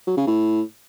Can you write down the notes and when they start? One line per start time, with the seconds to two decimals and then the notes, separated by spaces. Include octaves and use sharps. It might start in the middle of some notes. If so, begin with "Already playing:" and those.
0.07 F#3
0.17 C#3
0.27 A2